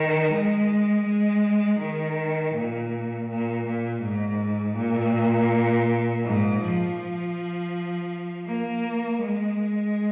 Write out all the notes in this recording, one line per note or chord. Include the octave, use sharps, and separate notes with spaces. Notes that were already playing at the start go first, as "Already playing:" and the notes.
Already playing: D#3
G#3
G#3
D#3
A#2
A#2
A#2
G#2
A#2
G#2
F3
A#3
G#3